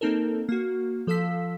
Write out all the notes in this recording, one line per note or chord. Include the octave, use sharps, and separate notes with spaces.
A#3 C4 D#4 A4 A#4
A#3 F#4
F3 A4 F5 E6 B6